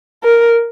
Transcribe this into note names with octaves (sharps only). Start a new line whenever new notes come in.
A#4